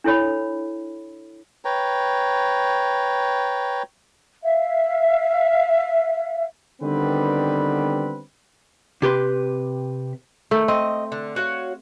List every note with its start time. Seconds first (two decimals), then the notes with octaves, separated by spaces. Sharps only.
0.04 D4 E4 A4 C#5 B5
1.65 B4 C#5 G5 A#5
4.43 E5 F5
6.82 D3 D#3 G3 B3 C4 B4
9.02 C3 G4 B4 C6
10.51 D#3 A3
10.68 C4 D#5
11.12 D3
11.36 F#4 C#5 F5